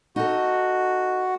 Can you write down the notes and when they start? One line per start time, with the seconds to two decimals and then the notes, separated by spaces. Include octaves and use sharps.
0.16 D#4 F#4 A4